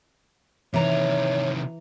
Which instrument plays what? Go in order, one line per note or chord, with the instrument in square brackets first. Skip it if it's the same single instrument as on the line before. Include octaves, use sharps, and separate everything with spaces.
[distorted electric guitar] C3 D#3 [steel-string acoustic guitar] E3 A#5 [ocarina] C#5